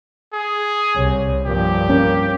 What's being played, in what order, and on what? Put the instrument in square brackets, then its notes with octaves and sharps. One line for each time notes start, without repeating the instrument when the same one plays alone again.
[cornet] G#4
[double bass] C2 [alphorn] C#5
[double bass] G2 F3 [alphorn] A#2 [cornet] G4
[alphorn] A#3 [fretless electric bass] C#4